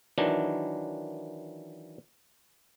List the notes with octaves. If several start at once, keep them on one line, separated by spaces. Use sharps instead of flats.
D#3 E3 F#3 D4